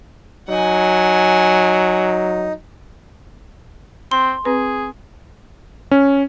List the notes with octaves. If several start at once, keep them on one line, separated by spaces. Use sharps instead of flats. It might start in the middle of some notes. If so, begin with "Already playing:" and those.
F#3 D#4 F#5 G#5
C4 C6
C4 G#4 B4
C#4